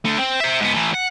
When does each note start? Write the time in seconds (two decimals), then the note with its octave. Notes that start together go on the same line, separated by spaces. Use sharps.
0.05 D3 A3
0.19 C4
0.40 C5 E5
0.60 G#2 B3
0.74 E3 A3
0.94 F#5